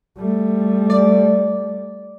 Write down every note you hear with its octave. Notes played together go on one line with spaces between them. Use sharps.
G3 A3
D5